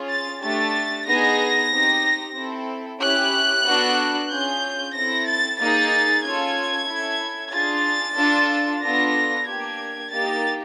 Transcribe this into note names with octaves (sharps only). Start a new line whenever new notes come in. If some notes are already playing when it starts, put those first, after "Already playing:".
Already playing: C#4 F4 G#4
A6
A3 D4 G4 A6
B3 D#4 G#4 A#6
C4 D#4 G4
C4 E4 A4
C#4 E4 G4 F#6
B3 D4 F#4 A4
C#4 F4 G#4 G6
C4 E4 A4 A#6
A6
A#3 D#4 G#4 A6
C#4 F4 A4 G#6
C#4 E4 A4
D4 F4 G#4 A6
D4 F4 A4
B3 D4 F4 A4 A#6
A#3 D4 G4 G#6
A#3 D#4 G4 A6